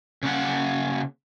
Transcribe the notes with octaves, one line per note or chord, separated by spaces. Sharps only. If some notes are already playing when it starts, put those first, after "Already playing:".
C#3 A#3 F#5